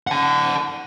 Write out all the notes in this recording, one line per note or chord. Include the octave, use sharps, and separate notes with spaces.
F#5 A5